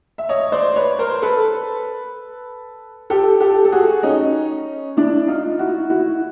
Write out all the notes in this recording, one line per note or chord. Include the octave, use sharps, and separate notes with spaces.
E5
C#5 D#5
C5 D5
B4 C#5
A#4 C5
A4 B4
G4 A4
G4 A4
A4
F#4 G#4
C#4 D#4
D4 E4
D#4 F4
E4 F#4
E4 F#4